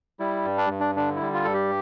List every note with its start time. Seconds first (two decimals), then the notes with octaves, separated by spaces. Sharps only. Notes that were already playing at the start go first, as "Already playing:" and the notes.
0.19 G3 E4
0.45 G2
0.58 D4
0.70 G2
0.80 D4
0.96 D3 D4
1.16 E4
1.21 G3
1.33 F4
1.44 G2 A4
1.54 G4